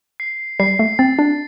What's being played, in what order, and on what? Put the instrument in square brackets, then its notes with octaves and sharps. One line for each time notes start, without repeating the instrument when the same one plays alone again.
[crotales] C7
[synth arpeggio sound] G3 [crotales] C7
[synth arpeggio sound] A3
[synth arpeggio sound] C4 [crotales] A6
[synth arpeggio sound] D4